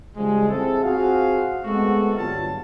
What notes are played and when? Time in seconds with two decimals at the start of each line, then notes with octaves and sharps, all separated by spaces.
0.17 C#3 F3 G3 G#3
0.49 C4 E4 G#4 A4
0.83 C4 F4 F#4 G#4 F5
1.65 G#3 A3 B3 C4 F#4 A4
2.16 G1 G2 F#3 F4 F5 A5